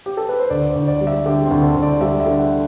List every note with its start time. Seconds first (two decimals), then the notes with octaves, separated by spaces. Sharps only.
0.06 G4
0.17 A4
0.29 B4
0.39 C5
0.50 D2 D5
0.69 C5
0.76 D2
0.88 D5
1.01 G3
1.07 E5
1.26 D3 G4
1.45 C4
1.51 D2
1.63 A4
1.76 D2
1.82 D5
2.01 G3 E5
2.20 E5
2.26 D3
2.39 F#5